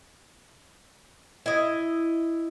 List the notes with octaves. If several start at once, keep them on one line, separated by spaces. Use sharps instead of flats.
E4 D#5